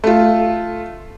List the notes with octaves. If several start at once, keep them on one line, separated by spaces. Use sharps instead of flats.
A3 F4